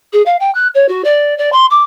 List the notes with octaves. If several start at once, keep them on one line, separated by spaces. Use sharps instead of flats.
G#4
F5
G5
F#6
C#5
F#4
D5
D5
C6
D6